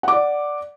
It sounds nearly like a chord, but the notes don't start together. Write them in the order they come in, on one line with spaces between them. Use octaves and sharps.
F#5 D6 D5